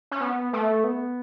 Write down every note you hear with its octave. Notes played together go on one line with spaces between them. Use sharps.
C#4
B3
A3
B3